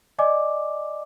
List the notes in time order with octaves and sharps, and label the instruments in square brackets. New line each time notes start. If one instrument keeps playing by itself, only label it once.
[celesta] D5 D#5 G#5 D6